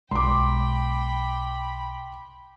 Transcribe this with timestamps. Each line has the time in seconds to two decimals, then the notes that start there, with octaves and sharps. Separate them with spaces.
0.11 B1 G#3 G5 B5 C6 D6